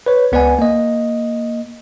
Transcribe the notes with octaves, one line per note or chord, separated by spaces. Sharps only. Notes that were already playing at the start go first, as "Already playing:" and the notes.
B4 C#5
C#2 B3 B4 D5 F#5 G#5
A#3 D#5